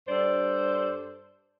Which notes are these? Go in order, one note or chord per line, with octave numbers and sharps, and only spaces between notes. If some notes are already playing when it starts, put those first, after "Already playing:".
G2 A4 C5 D5